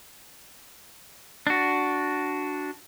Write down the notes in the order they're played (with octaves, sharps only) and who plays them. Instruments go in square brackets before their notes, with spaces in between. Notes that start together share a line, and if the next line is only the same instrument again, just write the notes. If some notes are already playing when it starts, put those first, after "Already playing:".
[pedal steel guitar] D4 F#4